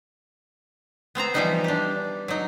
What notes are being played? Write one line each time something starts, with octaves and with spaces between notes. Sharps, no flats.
B3 C4 C5 A#5
E3 F3 G3 B3 D#4 B4
D4 G4
F#3 D#4